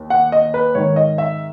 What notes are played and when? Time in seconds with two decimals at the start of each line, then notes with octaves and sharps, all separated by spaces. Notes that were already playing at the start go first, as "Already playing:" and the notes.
Already playing: D#2
0.10 F#5
0.32 D#5
0.54 B4
0.75 G#2 D#3 C#5
0.96 D#5
1.18 E5